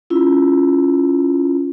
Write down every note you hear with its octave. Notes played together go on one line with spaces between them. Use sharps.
C#4 E4 F4